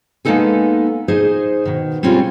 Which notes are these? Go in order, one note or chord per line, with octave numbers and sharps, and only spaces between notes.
G#3 A#3 B3 D#4 A4 G#5
D#4 G#4 C5 D#5
B2 D#3
G3 G#3 C4 C#4 F4